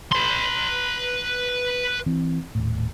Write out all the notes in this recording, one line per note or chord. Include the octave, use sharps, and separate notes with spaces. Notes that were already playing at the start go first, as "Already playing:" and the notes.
B4 C6
E3 C4
D#1 A2